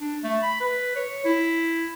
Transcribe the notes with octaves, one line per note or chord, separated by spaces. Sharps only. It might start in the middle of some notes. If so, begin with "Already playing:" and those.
D4
A3
B5
B4
C#5
E4